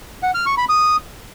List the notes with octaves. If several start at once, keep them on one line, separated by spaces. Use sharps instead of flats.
F#5
F6
C#6
B5
D#6